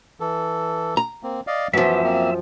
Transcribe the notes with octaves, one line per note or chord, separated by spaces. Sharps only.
E3 A4
A#5
A#3 C4
D5 D#5 F5
F#2 E3 F3 B3 E5
A#3 C4